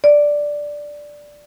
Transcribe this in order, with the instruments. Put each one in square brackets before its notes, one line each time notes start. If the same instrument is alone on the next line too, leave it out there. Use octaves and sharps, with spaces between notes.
[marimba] D5